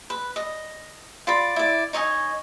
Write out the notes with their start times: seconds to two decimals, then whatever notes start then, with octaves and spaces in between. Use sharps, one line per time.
0.10 B4
0.36 D#5
1.27 F4 D5 B5
1.56 E4 D5
1.93 D#4 C#5 D#5 G#5